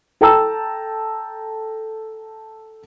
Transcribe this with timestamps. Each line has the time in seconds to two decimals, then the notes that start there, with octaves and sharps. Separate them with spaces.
0.21 A4 G5 A5 A#5 E6